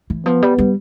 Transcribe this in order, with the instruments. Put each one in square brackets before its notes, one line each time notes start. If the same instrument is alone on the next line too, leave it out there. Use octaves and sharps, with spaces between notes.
[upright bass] E3
[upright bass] F3 [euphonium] B3
[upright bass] G3
G3